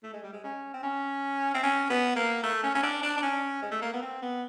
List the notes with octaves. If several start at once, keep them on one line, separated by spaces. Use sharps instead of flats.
A3
G#3
G3
G#3
C#4
C4
C#4
C4
C#4
B3
A#3
A3
C#4
C#4
D4
D4
D4
C#4
G#3
A3
A#3
B3
C4
B3